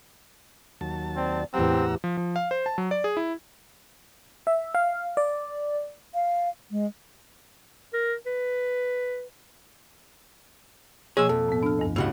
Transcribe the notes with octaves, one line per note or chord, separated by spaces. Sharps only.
D#2 F#3 A5
C4 D5
E2 A2 C4 G4 F#5 A#5 E6
F3
F3
F5
C5
A5
F#3
D5
G#4
E4
E5
F5
D5
F5
G#3
A#4
B4
B2 F3 A#3 G#4 C#5 E6
F2 A4
A2 B3
D4 F6
D2 G2
A2 C#3 F#4 G4 D#5 F#5